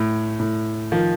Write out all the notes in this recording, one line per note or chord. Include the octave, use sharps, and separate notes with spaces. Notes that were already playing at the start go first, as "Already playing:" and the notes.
Already playing: A2
A2
D#3 F3